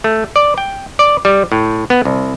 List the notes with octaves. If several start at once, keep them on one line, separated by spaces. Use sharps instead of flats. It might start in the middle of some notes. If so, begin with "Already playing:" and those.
A3
D5
G5
D5
G3
A2
B3
C2